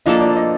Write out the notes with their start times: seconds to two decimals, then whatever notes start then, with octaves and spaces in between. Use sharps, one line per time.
0.06 F3 A#3 D4 A4 D#5
0.21 D5
0.36 D#5